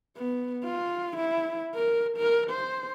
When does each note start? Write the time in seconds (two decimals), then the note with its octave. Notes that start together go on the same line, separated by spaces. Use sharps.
0.17 B3
0.64 F4
1.16 E4
1.75 A#4
2.17 A#4
2.51 C5